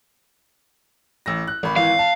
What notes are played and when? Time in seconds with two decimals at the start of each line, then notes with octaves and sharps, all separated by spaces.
1.26 A1 E6 A#6
1.47 F#6
1.63 G#1 B5
1.76 G#1 E3 F5
1.99 A5